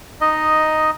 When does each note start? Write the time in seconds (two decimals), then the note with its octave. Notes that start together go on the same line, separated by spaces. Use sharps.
0.21 D#4 D#5